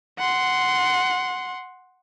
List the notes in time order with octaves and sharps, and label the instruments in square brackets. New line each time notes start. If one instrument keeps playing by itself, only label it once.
[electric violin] F#5 C6